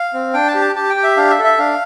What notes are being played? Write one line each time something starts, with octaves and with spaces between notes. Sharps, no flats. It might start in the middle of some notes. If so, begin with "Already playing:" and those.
Already playing: F5
C4
D4 G5
A5
G4
A5
G4 A5
G5
G4
E5
D4 F5
E5
A4
E5
D4 F5